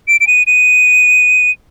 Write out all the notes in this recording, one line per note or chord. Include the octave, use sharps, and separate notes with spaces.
D7
D7
D#7
D#7